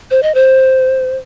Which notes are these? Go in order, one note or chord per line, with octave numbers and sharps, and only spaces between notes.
C5
D#5
C5